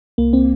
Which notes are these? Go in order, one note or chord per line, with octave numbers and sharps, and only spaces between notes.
C2 A#3
C4